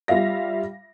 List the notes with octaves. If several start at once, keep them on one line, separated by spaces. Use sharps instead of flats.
G3 F4 E5 F5 A#6